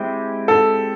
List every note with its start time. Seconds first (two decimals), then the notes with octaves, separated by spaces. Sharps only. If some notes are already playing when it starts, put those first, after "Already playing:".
Already playing: G#3 C4 E4 G4
0.48 A4